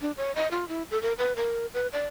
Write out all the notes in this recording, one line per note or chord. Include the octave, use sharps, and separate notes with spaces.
D4
C#5
D#5
F4
E4
A4
A#4
B4
A#4
B4
D5